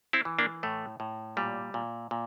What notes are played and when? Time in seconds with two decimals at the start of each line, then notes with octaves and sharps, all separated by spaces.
0.13 C4 E4
0.25 E3
0.39 A#3 D4
0.63 A2 A3
1.00 A2
1.37 A#2 G3
1.74 A#2
2.11 A#2